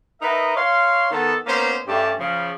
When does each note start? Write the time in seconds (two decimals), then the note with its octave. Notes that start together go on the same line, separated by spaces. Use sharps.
0.22 D#4 A#4 B4 D#5 E5
0.56 C#5 F5 C6
1.11 D#3 B3 A4
1.47 A#3 B3 C#4 D#4 C5
1.87 G2 G3 A3 C#4 G4 A5
2.20 C#3 F3